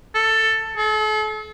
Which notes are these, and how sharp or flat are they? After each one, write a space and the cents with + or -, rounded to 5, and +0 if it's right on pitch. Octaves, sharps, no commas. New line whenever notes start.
A4 +10
A4 -40